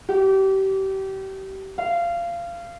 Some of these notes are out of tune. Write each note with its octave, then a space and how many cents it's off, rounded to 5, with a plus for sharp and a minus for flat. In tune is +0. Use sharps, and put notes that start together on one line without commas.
G4 -30
F5 -25